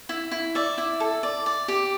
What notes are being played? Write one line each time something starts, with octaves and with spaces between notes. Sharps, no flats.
E4
E4
D5 E5
E4
A4
D5
D5
G4